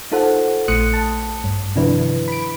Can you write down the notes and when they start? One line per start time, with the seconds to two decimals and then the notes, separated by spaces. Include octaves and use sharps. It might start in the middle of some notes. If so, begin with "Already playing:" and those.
0.12 D#4 F4 A4 C5 F#5
0.68 A#1 A3 C6 D#6 F#6 C#7
0.94 A5
1.44 G2
1.76 C3 D#3 F3 D4 E4 B4
2.28 B5 D7